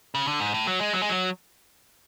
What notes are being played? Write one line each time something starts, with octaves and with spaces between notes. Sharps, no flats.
C#3
D3
G#2
A2
F#3
G#3
F#3
G#3
F#3